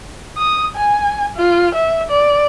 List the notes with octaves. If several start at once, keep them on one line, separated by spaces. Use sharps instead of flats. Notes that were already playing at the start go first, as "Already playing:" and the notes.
D#6
G#5
F4
E5
D5